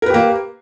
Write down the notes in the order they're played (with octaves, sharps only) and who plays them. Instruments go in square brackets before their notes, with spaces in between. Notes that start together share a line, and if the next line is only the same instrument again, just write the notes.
[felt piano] A#4
B4
G4
A#3